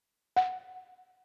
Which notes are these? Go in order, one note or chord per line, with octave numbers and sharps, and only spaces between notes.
F#5